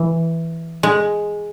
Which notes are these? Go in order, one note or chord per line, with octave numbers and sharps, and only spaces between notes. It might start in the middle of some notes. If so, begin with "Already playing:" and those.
Already playing: E3
G#3